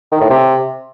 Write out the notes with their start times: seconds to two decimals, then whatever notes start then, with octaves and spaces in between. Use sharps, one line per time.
0.12 D#3
0.21 A2
0.30 C3